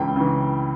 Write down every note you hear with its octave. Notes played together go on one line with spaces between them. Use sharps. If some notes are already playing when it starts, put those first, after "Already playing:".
Already playing: C#2 C#3 E3 G5
C#3 E3